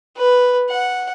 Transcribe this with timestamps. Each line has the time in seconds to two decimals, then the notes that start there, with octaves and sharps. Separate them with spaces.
0.17 B4
0.69 F#5